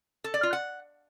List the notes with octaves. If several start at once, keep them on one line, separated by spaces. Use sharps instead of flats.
A4
D5
F4
F#5